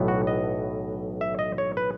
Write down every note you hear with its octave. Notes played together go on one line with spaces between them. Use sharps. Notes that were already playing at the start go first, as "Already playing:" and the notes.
Already playing: B1 A2 E3 B3
F#4
D#5
E5
D#5
C#5
B4